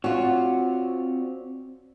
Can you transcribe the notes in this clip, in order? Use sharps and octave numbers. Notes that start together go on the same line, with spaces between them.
C4 F4 F#4 C#5 D5